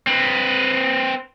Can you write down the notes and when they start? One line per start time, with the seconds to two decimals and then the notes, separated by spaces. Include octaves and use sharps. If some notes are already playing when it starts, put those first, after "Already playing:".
0.07 C4 B4